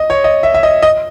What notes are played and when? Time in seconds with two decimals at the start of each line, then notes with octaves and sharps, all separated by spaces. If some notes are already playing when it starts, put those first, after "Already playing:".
Already playing: D#5
0.10 C#5
0.24 D#5
0.43 E5
0.54 E5
0.63 D#5
0.83 D#5